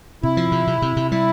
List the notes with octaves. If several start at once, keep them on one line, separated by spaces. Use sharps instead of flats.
C3 E4
F3
C3
C3
C3
C3
G3 E4